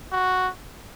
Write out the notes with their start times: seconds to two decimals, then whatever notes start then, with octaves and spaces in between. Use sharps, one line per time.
0.12 F#4